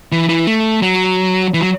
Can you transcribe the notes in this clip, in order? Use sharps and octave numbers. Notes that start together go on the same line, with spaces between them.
E3
E3
A3
F#3
E3
F#3